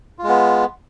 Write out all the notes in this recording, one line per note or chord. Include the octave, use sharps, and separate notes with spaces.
G#3 B3 F4